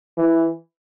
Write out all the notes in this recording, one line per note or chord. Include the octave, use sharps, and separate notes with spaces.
E3